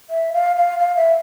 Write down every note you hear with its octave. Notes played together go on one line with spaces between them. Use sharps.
E5
F5
F5
F5
E5